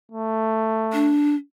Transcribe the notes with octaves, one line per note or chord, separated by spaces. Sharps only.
A3
D4